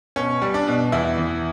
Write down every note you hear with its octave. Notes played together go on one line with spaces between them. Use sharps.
B2 C#4
G3
D4
B2
E2 E4
E2